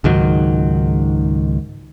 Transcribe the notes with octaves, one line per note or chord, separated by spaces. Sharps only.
C#2 G#2 D#3 F#3